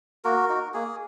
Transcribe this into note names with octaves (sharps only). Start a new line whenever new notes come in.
A#3 F#4 A#4
D#4 F#4
A#3 G#4